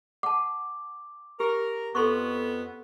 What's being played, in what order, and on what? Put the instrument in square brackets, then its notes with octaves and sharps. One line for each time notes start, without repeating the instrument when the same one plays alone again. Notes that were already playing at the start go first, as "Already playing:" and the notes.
[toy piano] F#5 A5 [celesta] D6
[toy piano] G4 [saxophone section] A#4
[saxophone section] F2 B3 [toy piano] A4 C6 C#6